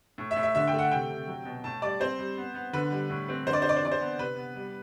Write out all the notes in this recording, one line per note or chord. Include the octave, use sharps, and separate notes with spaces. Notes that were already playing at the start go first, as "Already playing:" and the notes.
A2
E5
A2
E5
D3 E5
G5
A3
F#5
C3 G5
C3
F#3
B2
A2 A5
G3 D5
C4 C5
G3
B3
B3
D3 B4
G3
A2
C4
D3 C5
D5
D4 C5
D5
C5
E3 D5
C5
B3
C3 B4
B3
G3